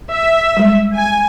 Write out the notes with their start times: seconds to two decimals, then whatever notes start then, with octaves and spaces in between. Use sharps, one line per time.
0.12 E5
0.57 G3 G#3
0.95 G#5